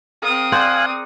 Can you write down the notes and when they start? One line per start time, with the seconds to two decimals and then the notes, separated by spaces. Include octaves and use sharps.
0.22 C4 G#4 A#4 F5 D#6
0.52 G#4 C5 D5 F5 F#5 G#5 F#6